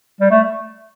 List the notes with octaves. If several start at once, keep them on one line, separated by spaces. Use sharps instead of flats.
G3
A3